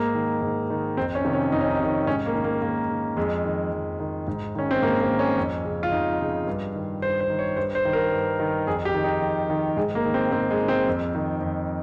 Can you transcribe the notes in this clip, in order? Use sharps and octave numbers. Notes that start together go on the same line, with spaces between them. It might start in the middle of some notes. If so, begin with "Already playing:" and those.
Already playing: G#2 A#3
D#3
G#2
D#3
F2 C4
C#4
C3 D#3
C#4
F2 D#4
C#4
D#4
C3 D#3
G#2 C#4
A#3
D#3
A#3
G#2 A#3
D#3
F2 G#3
D#3
F2
D#3
G#2
D#3 C#4
C4
G#2 A#3
A#3
D#3
C#4
F2
C#3
F4
F2 D#4
C#3
G2
D#3
G2 C5
C5
D#3
C#5
G2 C5
C5
D#3
A#4
G2
D#3
F2 G#4
G4
D#3
D#4
F2
D#3
G#2 G#3
A#3
D#3
C4
G#2 C4
G#3
D#3
C4
F2
D#3
F2